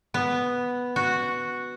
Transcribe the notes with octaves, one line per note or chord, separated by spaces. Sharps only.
B3
F#4